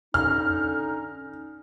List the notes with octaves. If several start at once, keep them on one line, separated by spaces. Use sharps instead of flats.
D3 C#4 D#4 F6